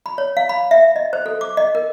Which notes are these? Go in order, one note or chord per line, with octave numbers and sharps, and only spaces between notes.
B5
C#5
F5
B5
E5
D#5
C5
A4
D6
D#5
A#4